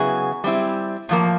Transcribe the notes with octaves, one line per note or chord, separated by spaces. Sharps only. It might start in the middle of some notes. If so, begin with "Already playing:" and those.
Already playing: C#3 F#3 B3 E4 G#4
G3 C4 E4
A2 F3 A#3